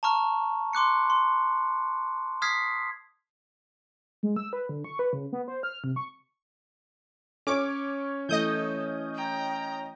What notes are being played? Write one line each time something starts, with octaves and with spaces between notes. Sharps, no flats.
A5 A#5 C#6 F6
C6 D6 F#6 C#7
C6
D#6 F6 G#6 B6 C7
G#3
E6
B4
D3
C#6
B4
C#3
B3
C5
F6
C3
C#6
C#4 C#5 D6
E3 A3 A4 D#5 D#6 G6
G5 A#5